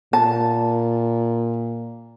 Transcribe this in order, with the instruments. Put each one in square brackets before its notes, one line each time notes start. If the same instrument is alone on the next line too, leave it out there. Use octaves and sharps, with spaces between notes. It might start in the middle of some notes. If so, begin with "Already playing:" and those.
[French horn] A#2 [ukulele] A5